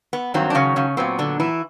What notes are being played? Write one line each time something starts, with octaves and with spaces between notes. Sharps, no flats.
B3
G2 D#3 F#3 C4
D4
C#3 C#4
C#3 C#4
A#2 F#3 B3 C4
D3 D4
E3 E4